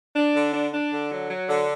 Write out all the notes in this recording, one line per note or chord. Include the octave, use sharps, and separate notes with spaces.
D4
D3
D4
D4
D3
F#3
F#3
D3